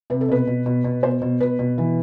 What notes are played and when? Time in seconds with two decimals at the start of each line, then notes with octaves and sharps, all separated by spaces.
0.10 C3 B4
0.21 A4
0.29 B2 B4
0.47 B2
0.66 B2
0.84 B2
1.03 B2 C5
1.22 B2
1.40 B2 B4
1.59 B2
1.78 E3